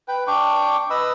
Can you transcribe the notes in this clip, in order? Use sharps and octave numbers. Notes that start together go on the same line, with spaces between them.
B4 G5
D4 G5 C#6 D6
B4 D#5 B5 E6